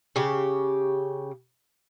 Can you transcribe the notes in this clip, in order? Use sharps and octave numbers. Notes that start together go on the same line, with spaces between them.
C#3 G4